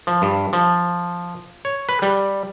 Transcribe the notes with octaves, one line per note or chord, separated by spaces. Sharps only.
F3
G2
F3
C#5
B4
G3